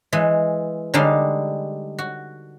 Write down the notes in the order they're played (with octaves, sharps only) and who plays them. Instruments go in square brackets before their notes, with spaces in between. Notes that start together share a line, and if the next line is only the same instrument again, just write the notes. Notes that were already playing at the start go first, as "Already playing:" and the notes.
[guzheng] E3 G#3
D3 G3 G#3 D#4 F5
F#4